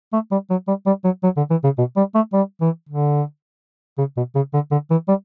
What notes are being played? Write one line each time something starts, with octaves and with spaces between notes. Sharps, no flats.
A3
G3
F#3
G3
G3
F#3
F#3
D3
E3
C#3
B2
G3
A3
G3
E3
D3
C#3
B2
C#3
D3
D3
E3
G3